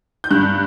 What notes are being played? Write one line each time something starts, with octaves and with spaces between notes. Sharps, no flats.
G6
G2 F#6